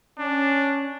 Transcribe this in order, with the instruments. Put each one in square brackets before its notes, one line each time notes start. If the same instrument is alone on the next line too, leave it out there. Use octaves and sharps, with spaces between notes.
[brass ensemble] C#4 [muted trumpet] D4